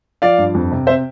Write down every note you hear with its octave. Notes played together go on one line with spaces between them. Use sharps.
F3 D5 F5
G2
F2
C3
C3 C5 E5